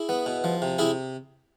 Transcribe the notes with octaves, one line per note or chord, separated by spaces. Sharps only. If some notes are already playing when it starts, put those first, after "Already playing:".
Already playing: E4 G#4
B3
B2
F3
C3
C3 E4 G#4